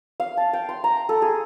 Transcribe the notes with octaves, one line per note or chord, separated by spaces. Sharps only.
F5
A5
G5
C6
A#5
A4
G#4